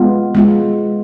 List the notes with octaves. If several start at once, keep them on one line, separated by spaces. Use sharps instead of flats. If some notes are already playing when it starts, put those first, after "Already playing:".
Already playing: G#3 B3 F4
G#3 B3 F4